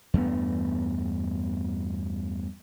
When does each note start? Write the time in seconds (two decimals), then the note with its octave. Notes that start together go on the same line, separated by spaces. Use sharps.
0.14 E2 G2 A3 B3